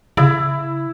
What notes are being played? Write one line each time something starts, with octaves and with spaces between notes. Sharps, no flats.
C#3 E4